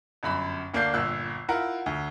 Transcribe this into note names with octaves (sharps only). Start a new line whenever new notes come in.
G1 F#2 B5
D2 A#3 D4 G6 C7
G1 A#2 E6 F#6
E4 F4 A#4 F#5
D2